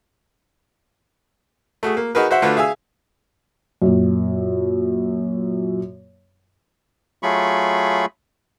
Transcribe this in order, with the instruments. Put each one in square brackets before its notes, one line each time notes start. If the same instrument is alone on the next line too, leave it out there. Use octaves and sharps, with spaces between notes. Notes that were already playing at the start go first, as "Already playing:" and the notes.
[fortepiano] A3 F#4 G#4
A#3
D#4 F#4 G#4 A#4 B4
F#4 C5 E5 F#5
D3 A3 D4 F4 F#4 B4
G#4 E5 F5 G#5 E6
[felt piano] F#2 A#2
[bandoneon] F#3 A3 F4 G#4 B5 C#6